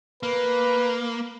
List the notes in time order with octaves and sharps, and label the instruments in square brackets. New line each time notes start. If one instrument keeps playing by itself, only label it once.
[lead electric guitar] A#3 [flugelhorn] B4